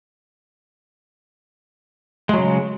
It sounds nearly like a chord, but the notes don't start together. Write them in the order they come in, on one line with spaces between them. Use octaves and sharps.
G#3 F#3 C#3